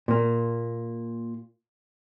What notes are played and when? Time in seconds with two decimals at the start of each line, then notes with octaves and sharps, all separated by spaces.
0.08 A#2 A#3